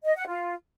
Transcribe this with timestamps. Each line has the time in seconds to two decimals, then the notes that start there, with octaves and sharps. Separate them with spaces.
0.04 D#5
0.16 F#5
0.27 F4